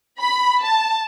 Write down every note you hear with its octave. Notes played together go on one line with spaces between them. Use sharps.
B5
A5